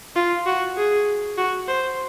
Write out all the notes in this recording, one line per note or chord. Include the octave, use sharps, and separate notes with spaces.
F4
F#4
G#4
F#4
C5